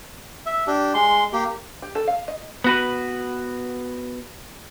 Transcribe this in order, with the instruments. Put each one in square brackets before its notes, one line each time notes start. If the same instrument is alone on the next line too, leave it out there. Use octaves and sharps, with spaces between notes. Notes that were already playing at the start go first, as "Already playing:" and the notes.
[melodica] E5
D4 G4
G#3 C6
A#3 G4
[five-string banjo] G4
A4
F5
D#5
[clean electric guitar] B3 F#4 B4